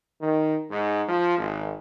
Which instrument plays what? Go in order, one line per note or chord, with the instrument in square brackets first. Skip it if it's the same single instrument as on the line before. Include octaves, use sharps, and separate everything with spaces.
[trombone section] D#3
G#2
F3
G#1